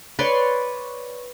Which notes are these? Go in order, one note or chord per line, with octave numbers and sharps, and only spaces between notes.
B4 C#5 D5 C6